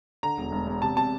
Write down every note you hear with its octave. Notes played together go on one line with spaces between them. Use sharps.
D3 A#5
E1
E1
E2
C3 A5
C3 A5